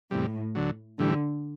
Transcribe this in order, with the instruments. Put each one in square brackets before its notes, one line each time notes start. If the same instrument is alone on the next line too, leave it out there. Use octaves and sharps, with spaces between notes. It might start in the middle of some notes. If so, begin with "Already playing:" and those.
[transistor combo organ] E2 C3 G3 [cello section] A2
[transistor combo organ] D2 D3 F#3
[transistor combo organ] A2 E3 G3 [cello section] D3